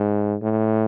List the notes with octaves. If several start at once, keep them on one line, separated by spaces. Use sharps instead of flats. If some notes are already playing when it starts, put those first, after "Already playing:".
Already playing: G#2
A2